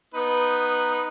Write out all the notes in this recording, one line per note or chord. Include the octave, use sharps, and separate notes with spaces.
B3 D#4 B4